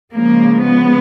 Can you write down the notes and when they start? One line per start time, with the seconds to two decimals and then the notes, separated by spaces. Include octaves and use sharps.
0.13 C#3 F3 G#3 A#3
0.62 B3